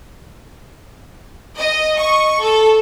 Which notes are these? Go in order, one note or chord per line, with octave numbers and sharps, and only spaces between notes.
D#5
C#6
A4